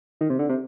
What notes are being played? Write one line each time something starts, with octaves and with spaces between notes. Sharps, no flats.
D#3
C3
D3
C3